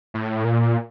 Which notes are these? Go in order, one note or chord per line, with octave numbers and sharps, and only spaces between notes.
A2
A#2